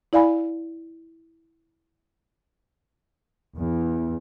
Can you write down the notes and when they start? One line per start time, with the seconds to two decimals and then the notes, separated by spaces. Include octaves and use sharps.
0.13 E4 D5 F5 G#5 B5
3.56 E2